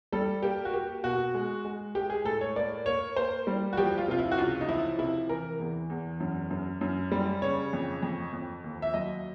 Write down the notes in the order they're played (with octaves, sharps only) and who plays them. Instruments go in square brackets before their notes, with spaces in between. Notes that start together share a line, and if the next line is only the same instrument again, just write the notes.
[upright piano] G3 A4
A#3 G4
F#4
A#3 G4
B2 F#4
G#3
G#3
G#3 G4
G#4
A2 A4
C#5
A#3 D5
A#3 C#5
A#3 C5
G3
F#4
F3 G4
F4
C3 F4
E4
F#4
C#2 F4
D#4
F3 E4
C3 E4
E3 A#4
E2
E2
F#2
F#2
F#2
G3
C#3 C#5
F2
F2
F2
D#2
E5
F#3 D#5